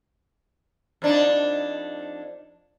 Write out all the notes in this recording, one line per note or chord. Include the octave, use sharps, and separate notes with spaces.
F2 D4 D#4